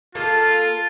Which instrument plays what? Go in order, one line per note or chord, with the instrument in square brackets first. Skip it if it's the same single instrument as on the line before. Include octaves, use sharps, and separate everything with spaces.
[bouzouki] A#3 A4 [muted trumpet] F4